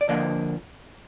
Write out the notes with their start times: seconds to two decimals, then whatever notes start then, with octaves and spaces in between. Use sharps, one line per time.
0.01 D5
0.09 D3 F3 A#3 D4 D#5